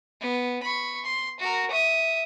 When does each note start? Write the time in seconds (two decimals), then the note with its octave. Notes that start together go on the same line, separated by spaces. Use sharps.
0.21 B3
0.62 B5 C#6
1.05 C6
1.40 F#4 A#4
1.71 E5 D#6